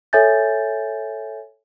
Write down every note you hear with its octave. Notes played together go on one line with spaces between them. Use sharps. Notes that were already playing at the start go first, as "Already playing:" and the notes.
A4 C#5 E5 G#5 G6 A6